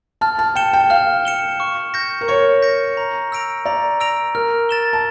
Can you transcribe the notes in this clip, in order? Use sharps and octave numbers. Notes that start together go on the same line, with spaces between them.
A5 F6
A5
G5 C#7 E7 G7
G5
F5 F6
C#7 E7 G7
C#6
G6 A#6 C#7
A#4
C#5 C#6
G6 A#6 C#7
A#5
E6 A#6 D7 F7
D5 A#5
E6 A#6 D7 F7
A#4 F6
A6 E7 G7
A5